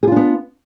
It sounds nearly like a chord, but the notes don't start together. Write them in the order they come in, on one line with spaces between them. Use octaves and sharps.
G#4 F4 D4 B3